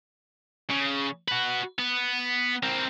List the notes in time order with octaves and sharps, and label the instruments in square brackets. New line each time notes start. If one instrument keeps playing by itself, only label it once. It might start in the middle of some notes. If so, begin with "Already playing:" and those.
[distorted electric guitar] C#3
F#4 B4
B3
C4 A#4